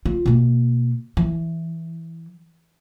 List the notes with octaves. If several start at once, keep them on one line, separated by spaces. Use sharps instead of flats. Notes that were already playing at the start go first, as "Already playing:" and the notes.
F4
B2 A#3
E3